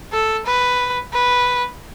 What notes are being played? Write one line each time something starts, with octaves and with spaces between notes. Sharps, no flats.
A4
B4
B4